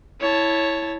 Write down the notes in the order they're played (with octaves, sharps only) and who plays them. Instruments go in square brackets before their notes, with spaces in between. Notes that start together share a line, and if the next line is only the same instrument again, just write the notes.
[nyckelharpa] E4 A5 [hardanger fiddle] C#5